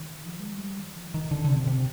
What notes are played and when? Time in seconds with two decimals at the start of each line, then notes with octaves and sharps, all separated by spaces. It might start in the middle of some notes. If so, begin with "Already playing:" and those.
Already playing: D#3
0.25 F3
0.40 G#3
0.52 G3
0.79 D#3
0.96 F3
1.14 D#3
1.31 D3
1.45 D3
1.49 C3
1.67 C3